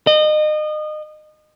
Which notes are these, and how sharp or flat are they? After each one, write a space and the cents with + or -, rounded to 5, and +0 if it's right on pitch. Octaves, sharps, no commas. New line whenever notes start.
D#5 -30